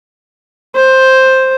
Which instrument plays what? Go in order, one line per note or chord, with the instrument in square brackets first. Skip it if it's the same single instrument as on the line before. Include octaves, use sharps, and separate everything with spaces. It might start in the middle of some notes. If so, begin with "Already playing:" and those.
[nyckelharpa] C5